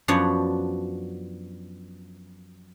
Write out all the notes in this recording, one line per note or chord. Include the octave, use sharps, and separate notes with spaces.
F#2 F3 B3 D4 C#5